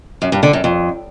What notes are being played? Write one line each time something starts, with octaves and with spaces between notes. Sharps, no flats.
F#2
G2
D3
F#2
F2